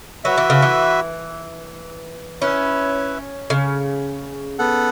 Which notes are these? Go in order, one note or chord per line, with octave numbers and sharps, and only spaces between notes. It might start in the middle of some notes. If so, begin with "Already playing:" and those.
F#3 F#4 B4 E5
E3
C#3
E3
C#4 E4 B4 E5
C#3
B3 A4 F#5